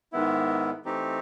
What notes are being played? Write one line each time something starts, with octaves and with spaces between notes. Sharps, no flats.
G#2 D#3 G#3 B3 E4
E3 A3 C4 D#4 G4